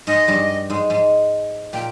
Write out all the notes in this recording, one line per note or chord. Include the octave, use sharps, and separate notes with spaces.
G#2 G#3 D#5
G2 G3
G#2 G#3
G#2 G#3
A#2 A#3 G5